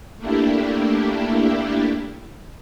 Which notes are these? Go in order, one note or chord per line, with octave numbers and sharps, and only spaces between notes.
A3 A#3 D4 E4 G4